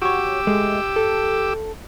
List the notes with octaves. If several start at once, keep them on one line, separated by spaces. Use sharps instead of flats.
F#4 G4 C#5 D6 E6
G#3 A3
A4